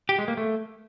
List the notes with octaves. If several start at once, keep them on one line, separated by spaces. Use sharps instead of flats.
G4
G#3
A#3
A3